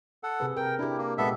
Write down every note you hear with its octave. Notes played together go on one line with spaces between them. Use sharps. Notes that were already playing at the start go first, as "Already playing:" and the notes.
A4 F#5
C3 G#4 B4
A#4 G5
D4 E4 G4
A#3
A#2 G#3 B3 G4 A4 E5